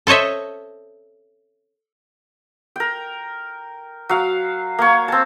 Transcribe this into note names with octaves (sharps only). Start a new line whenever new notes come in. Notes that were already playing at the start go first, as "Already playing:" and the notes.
A4 C5 C#5 D#5 E5
A#4 G5
F#3 F5
A#3 C#5
C4 A5